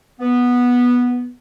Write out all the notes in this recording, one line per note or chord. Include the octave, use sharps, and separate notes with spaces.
B3